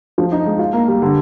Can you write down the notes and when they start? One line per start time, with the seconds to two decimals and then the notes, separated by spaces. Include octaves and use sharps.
0.18 F3
0.32 D#4
0.46 G#3
0.59 F4
0.73 A#3
0.88 G3
1.02 D3